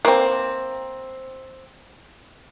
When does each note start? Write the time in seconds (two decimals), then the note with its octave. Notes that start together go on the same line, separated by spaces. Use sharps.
0.05 A#3 C4